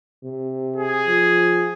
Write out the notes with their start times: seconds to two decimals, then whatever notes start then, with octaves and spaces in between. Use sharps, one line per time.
0.24 C3
0.76 G#4
1.07 F3